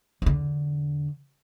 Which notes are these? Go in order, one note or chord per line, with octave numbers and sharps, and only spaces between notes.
E2 D3